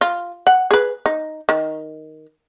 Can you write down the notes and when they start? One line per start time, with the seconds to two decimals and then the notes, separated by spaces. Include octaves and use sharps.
0.01 F4
0.47 F#5
0.71 G#4 B4
1.06 D#4
1.49 D#3